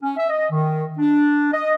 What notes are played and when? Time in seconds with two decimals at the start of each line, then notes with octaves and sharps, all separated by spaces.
0.02 C#4
0.17 E5
0.29 D#5
0.51 D#3
0.99 D4
1.52 D#5